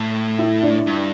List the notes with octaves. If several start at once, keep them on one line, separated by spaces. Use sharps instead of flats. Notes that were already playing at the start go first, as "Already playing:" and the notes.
Already playing: A2
E4
D4
G2